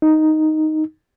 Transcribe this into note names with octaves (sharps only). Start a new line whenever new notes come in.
D#4